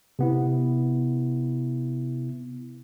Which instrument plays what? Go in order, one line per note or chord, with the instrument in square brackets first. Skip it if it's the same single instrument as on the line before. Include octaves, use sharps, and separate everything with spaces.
[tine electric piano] C3 B3 E4